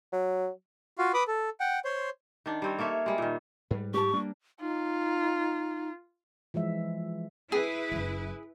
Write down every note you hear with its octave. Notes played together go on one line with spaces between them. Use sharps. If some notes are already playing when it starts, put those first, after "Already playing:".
F#3
F4 F#4 F5
B4 B5 D6 D#6
A4
F#5 G5
C5 C#5 C6
D#3 D4
G3 C4 C#5
A#3 A4 C#5 E5
G3 G#3
A#2 D#3
G#2 G3 B4
G4 A5 C#6
G3 A#3 D4
D#4 F4
E3 F3 G#3 E5
E4 G#4 B4
F#1 F#3